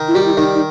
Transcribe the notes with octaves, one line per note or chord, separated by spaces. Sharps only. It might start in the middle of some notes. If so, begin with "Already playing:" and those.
Already playing: D#3
E4
G3 F#4
E4
D#3 D#4
D#4